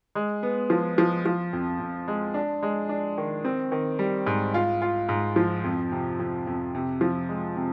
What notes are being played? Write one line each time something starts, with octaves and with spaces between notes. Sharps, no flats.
G#3
B3
F3
F3
F3
F2
F2
G#3
D4
G#3
D4
D#3
C4
D#3
G3
G#2
F4
F4
G#2
F3
F2
C3
F2
F2
C3
F3
G#3
C3